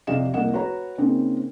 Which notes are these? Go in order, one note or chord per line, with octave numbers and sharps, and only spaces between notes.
F2 C3 D5 D#5 F5 E7
F1 C2 A#3 D#5 F#5 E7
F#4 B4 C#5 A#5
C#3 A#3 C4 D#4